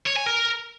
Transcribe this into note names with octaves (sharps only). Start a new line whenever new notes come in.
C#5
G#5
A#4